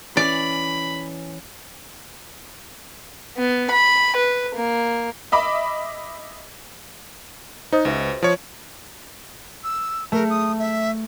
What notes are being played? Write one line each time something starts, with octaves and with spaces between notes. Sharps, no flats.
E3 C#4 D5 B5
B3
B5
B4
A#3
D#5 E5 B5 D6
D#4 C5 D#5 D#6
C#2 F#4 B4 E5
F3 C#5
E6
A3 A#4
D#6
E5